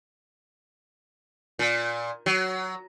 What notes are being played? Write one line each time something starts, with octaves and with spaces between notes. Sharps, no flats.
A#2
F#3